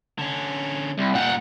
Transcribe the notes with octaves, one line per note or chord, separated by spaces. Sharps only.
D3 C#4
C2
A#2 G3 F#5 G5